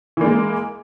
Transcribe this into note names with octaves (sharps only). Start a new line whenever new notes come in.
E3 G#3 A#3